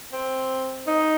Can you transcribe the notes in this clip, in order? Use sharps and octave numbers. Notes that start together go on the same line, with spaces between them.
C4
D#4